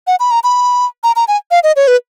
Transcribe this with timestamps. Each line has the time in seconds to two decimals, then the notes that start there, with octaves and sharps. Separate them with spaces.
0.07 F#5
0.20 B5
0.31 A#5
0.44 B5
1.04 A#5
1.16 A#5
1.28 G#5
1.51 F5
1.64 D#5
1.76 C#5
1.87 B4